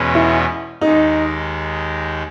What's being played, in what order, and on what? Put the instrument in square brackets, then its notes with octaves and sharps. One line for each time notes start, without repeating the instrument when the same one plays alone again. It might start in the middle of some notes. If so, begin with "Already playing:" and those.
Already playing: [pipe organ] E2 B2 G#3 C#4
[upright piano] E4
[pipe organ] D#2 D#3 G#3 [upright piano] D#4